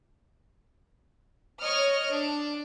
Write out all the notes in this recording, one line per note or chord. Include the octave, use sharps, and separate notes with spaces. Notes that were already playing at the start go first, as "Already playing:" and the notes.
C#5 D#5 F6
D4